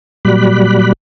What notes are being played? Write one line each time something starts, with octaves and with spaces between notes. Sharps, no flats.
A#2 F#3 G3 D5 B5 F#6